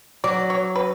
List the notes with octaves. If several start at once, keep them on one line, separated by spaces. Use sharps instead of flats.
F#3 D5
C#5
B4